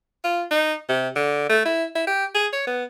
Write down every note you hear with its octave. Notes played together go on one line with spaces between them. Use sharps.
F4
D#4
C3
D3
A3
E4
E4
G4
G#4
C#5
B3